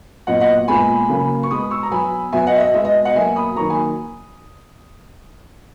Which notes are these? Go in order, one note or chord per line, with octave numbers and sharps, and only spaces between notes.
A#2 F#3 B3 D#5 F#5
D#5 F#5
A#2 G#3 B3 G#5 B5
C#3 F#3 A#3
C#6
B2 G#3 B3 B5 D#6
C#6 E6
A#5
B2 F#3 B3 G#5 B5
B2 F#3 B3 E5 G#5
D#5 F#5
E5
D#5
B2 G#3 B3 E5
D#5
D#5 F#5
B2 F#3 A#3 E5 G#5
B5 D#6
D#3 F#3 A#3 A#5 C#6
G#5 B5